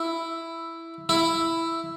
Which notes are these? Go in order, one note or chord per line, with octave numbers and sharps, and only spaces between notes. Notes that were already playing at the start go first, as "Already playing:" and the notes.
Already playing: E4
E4